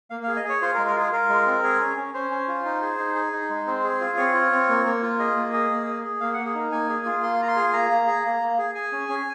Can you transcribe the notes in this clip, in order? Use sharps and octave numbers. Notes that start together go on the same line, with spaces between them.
A#3 F5
F5
G#4
D#5
G#4 C#5
F4 C5
A#4
G#3
A#4
F4 G#4
F4 A#4
G#3
C4
G#4
C#4
C#4
C#4 C5
C#4
F4
D#4
G#4
D#4
G#4
D#4
G#3
C4 C5
G#4
F4
C4 C#5
F4
C4
A#3
A#3
F4
G#4 D#5
A#3
G#4
A#3
G#4
G#4
A#3 F5
F#5
A#3
G#4
D#4 A#4
A#3 G#5
G#4
F4
A#3 C6
F4 A#5
C6
G#4
A#3 A#5
A#3
G#4
A#3
A#3
G#4
G#4 G#5
C#4
C#4